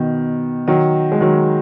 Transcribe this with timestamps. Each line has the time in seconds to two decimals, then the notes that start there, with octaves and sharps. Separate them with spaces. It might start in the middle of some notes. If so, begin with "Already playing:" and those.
Already playing: B2 D#3
0.68 D#3 F#3
1.12 G#3
1.21 D#3 F#3